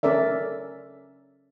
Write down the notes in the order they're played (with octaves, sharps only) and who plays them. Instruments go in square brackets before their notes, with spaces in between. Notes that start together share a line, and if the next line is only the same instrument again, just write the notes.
[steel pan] C#4 A4 A#4 D5 E5